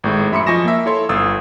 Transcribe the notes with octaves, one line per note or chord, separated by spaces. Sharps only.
G#1 A2 G#3
F#2 E5 B5 C6 D6 C#7
F3 D#5 G#5 C#6 A#6 E7
A#3 E5
E4 A4 C#5 C6
G1 F5 D#6 E6 A6